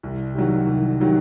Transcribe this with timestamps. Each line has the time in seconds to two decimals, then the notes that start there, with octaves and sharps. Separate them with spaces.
0.03 C2
0.34 C3 D#3 F#3
0.67 C2
0.99 C3 D#3 F#3